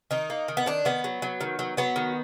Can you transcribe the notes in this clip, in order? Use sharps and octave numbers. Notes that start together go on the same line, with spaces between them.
D#3 D#4
A#3
D#3
B3
D#3 D4
D#3 B3
F#3
F#3
D#3
F#3
F#3 B3
D#3